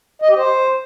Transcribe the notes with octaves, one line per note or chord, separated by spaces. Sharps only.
D#5
G4
C5